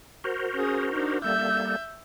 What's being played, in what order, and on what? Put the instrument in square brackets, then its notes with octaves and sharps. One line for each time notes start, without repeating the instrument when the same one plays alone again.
[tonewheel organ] F#4 A#4 C5
[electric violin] C#4 G#4
D4 D#4
[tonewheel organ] G3 A#3 A4 [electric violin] E5 G6